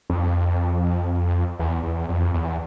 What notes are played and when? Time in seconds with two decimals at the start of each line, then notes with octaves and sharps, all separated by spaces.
0.10 F2
1.59 E2
1.83 E2
2.09 F2
2.34 E2